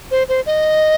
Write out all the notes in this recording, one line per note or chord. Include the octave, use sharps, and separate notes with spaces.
C5
C5
D#5